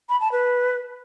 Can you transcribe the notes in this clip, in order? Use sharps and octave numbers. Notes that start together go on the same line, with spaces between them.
B5
A5
B4